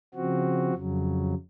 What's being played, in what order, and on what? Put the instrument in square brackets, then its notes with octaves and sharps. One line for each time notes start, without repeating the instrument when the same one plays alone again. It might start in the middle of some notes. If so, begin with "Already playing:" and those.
[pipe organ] C#3 F3 C4 F#4
F2 C#3 F#3